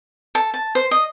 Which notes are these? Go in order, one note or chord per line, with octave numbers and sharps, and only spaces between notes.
A4
A5
C5
D#5